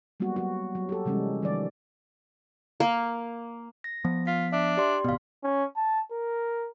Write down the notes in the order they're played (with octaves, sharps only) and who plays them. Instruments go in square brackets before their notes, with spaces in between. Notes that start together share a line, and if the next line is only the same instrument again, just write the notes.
[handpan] F#3 G3 A#3 B3 F#4
F#3 F#4
F#3
G4 A4
C3 E3 G3 G#3 C#4
D#3 F3 G3 D5
[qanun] A#3
[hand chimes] A#6
[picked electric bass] F3 B3
[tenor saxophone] F4 [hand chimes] B6
[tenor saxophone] D4 [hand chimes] E5
[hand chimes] G4 D5 C6
[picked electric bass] G#1 B2 [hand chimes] B3 F5
[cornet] C#4
A5
A#4